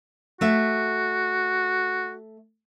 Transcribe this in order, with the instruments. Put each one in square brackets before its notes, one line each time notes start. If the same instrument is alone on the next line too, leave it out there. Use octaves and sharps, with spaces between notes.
[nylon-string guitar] A3 E5 [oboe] F#4